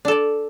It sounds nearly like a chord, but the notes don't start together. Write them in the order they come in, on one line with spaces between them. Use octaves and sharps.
D4 A4 D5